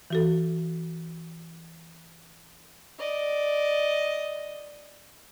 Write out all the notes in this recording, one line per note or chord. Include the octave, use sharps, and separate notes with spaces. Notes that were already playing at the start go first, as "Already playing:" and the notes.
E3 F#4 A4
D5 D#5